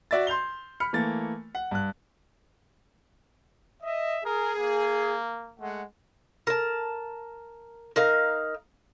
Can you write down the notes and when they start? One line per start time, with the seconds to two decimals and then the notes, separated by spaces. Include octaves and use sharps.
0.11 F#4 D5 E5 A6
0.27 C6 G6 F7 G7
0.80 B5 F6 C#7
0.93 E3 A3 A#3 A6
1.55 F#5
1.71 G2 F#6
3.83 D#5 E5
4.25 G#4 A#4
4.59 A#3
5.61 G#3 A3 F#5
6.47 A#4 A5
7.96 D#4 A#4 F5